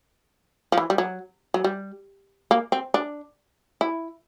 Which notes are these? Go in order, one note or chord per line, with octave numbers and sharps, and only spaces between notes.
F3
E3
G3
F#3
F#3
G3
A#3
C4
D4
E4